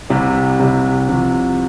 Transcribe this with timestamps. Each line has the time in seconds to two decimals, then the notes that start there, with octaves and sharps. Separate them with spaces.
0.10 C2 C3 G3
0.59 C2 C3 G3
1.09 C2 C3 F3